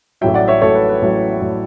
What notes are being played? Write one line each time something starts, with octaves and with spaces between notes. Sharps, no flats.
A1 A2 F#3 E5 G5
D5 F#5
C#5 E5
A1 A2 F#3 A4 C#5
B4
B4
A1 A2 F#3
A2 F#3